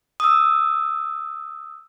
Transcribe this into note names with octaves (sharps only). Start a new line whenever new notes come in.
D#6 E6